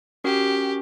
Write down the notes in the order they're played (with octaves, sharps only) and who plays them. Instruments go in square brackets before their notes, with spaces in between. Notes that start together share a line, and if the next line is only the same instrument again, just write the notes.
[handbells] C#4 F#4 A#4 [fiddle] G4